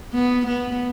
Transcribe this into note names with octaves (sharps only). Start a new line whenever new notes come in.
B3
B3